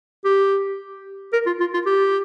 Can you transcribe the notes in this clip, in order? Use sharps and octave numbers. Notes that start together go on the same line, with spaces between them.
G4
A#4
F4
F4
F4
G4